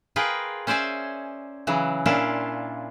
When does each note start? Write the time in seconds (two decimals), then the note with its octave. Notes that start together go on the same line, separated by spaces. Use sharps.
0.16 F4 G#4 A#4 B4 G5
0.67 C#4 C5 D5 E5 G#5
1.67 C#3 E3 F#3
2.06 A#2 C#4 D4 E4 F4